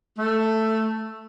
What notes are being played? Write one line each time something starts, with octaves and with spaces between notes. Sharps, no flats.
A3